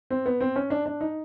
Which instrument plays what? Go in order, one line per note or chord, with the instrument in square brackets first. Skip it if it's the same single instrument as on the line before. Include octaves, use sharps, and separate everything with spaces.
[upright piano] C4
B3
C4
C#4
D4
D4
D#4